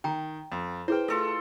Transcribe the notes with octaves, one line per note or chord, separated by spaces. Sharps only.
D#3 G5 A#5
F2
E4 G#4 B4 C5 G5
A3 F4 A4 D#5